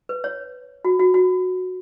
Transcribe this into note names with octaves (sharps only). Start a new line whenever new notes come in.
B4
C#5
F#4
F#4
F#4